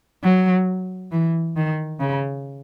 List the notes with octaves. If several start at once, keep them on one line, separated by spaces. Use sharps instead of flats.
F#3
E3
D#3
C#3